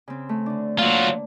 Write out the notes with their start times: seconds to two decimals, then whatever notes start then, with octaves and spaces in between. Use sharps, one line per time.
0.08 C#3 C4
0.29 A3
0.46 D3 D4
0.79 F#3 A#3 F4